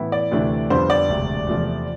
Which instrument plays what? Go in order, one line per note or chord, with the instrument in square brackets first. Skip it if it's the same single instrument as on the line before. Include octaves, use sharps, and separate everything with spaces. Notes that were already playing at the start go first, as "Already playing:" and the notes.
Already playing: [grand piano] A2 E3 B3 E4
[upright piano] D5
[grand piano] D2 C3 E3 A3 D4
[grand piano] F2 D3 G3 B3 F4 [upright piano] C5
[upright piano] D5
[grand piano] E1 D2 C3
E2 C3 F3 A3